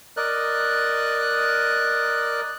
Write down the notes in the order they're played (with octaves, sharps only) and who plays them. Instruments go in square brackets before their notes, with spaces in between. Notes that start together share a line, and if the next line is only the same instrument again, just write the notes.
[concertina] A#4 D5 D#5 F#6